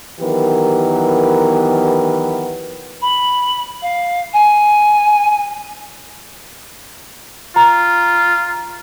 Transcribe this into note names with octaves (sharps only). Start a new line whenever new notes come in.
D#3 E3 F#3 B3 G4 A#4
B5
F5
G#5
F4 A#5